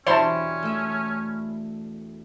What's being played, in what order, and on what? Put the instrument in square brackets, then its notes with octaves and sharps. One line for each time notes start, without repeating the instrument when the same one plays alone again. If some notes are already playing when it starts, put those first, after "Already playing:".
[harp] E1 G3 [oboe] C#4 [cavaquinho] E4 C6 C#6 [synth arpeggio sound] C5 A5
[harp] A3 E5